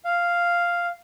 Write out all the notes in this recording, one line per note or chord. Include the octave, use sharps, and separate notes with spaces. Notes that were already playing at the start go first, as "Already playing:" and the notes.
F5